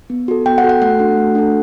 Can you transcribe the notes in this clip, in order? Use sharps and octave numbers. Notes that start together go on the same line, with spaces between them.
B3
F#4 A4
B3 G5
F#5
F#4 A4
F#5
A3 F#5
D4 F#4 A4
A3
D4 F#4 A4